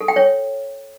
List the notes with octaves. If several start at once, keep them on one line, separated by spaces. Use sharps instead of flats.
A4
G5
C#5